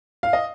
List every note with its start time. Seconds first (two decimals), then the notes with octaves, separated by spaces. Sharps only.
0.23 F5
0.33 D#5